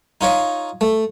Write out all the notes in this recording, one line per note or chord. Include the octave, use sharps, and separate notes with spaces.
D#4 F4 C#5 D#5
A3